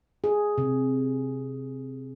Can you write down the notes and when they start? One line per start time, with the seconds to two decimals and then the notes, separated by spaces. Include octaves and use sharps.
0.24 G#4
0.58 C3